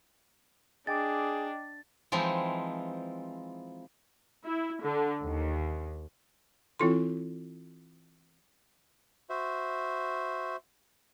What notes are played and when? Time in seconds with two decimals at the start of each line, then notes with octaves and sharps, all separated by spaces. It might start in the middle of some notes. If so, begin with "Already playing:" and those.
0.87 D4 G#4 D#5 G5 D6 A6
2.12 E3 F3 G#3 C4 D#4
4.44 E4
4.80 D3
5.22 D#2
6.79 E3 C4 E4 F4 A4 C6
9.30 F#4 C5 E5